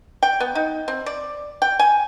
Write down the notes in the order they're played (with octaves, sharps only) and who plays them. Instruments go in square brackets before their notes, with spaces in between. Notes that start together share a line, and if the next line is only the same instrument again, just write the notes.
[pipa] G5
B3
D#4
C4
D5
G5
G#5